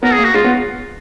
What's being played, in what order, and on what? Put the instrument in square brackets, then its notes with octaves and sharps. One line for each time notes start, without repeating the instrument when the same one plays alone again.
[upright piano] B3 [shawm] A#4
[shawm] G#4
[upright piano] A#3
[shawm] F#4
[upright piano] G#3 [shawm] F4
[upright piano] B3